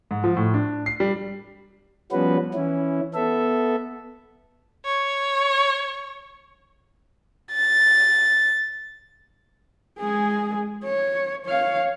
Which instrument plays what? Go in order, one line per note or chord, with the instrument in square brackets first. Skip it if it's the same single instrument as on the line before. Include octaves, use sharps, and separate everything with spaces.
[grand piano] G#2
F3
A2
D4
C7
G3
[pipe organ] F3 G3 B3 C#4 F#4 B4
E3 C#4 E4
B3 A4 E5
[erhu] C#5
[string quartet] A6
[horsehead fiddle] G#3 G#4
C#5
C#5 F5